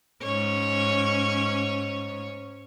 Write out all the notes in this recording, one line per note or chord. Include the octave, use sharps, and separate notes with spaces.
G#2 C#4 C#5